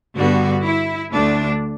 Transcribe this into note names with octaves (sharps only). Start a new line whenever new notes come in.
G2 D3 G3 B3 F#4
E4
D2 D3 A3 D4